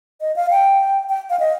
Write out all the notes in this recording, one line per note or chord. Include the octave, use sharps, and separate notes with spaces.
D#5
F5
G5
G5
F5
D#5